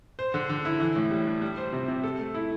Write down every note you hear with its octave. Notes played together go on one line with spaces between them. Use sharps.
C5
D3
D3
E4
E3
A2
G3
D4
G3
C5
C3
C3
A4
A3
E4